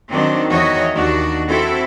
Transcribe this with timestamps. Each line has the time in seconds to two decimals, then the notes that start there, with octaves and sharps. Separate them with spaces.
0.10 D#3 F#3 C4 D4
0.49 E2 D#3 E3 F#4 C#5 D#5
0.94 D#2 D4 F#4
1.49 C4 E4 F#4 A4